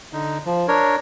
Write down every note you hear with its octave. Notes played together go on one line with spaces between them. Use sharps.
D3 D#4
F3
D4 A#4 C#5